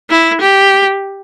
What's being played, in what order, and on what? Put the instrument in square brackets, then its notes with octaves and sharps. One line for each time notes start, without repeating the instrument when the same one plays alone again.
[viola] E4
G4